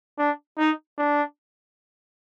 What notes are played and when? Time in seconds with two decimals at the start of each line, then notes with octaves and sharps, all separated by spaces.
0.18 D4
0.58 D#4
0.98 D4